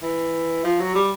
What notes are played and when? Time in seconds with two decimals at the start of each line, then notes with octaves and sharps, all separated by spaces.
0.03 E3
0.64 F3
0.79 F#3
0.95 G3